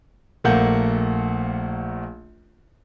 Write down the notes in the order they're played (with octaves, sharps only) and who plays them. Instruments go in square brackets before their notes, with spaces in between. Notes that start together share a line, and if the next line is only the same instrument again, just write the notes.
[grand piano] A#1 A3 A#3 F#5 G6